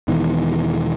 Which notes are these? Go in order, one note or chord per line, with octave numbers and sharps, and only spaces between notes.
E1 B2 D#3 E3